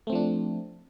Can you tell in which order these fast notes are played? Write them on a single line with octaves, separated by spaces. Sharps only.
A3 C4 F3 D4